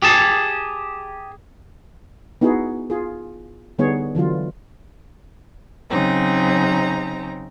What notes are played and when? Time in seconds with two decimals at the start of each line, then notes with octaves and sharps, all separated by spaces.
0.02 G4 G#4 A5
2.41 B3 D#4 E4 F#4 G#4
2.90 F4 G#4
3.78 D3 G3 B3 D#4 G#4 C#5
4.15 D3 E3 F#3 F4
5.90 C#3 F#3 C4 D#4 A#5